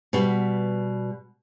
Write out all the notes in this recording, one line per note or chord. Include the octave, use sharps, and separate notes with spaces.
B2 G3